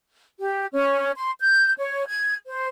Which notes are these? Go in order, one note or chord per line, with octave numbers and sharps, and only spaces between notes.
G4
C#4
C6
G6
C#5
G#6
C5